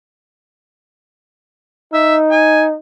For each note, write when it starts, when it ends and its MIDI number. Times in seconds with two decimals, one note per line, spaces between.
1.93 2.77 63
1.93 2.16 76
2.31 2.64 80